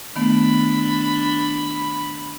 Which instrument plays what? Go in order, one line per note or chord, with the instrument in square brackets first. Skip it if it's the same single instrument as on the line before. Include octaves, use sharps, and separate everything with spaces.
[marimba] D#3 A3 B3 [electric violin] D4 B5